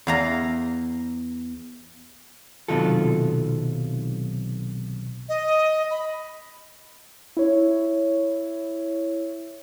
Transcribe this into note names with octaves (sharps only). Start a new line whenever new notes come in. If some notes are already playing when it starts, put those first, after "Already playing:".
E2 F5 A#5
B1 C3 D#3 F#3 F4 A4
D#5
B5
E4 C#5